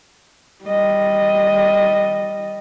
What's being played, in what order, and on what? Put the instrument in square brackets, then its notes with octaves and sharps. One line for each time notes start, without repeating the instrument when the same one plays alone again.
[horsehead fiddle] G3 D#5